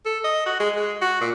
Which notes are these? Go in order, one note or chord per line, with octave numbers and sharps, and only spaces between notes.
A4
D#5
F#4
G#3
G#3
F#4
A#2